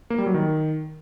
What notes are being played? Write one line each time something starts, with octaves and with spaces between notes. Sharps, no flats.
A#3
G3
F#3
D#3